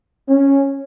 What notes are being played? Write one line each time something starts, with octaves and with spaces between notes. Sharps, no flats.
C#4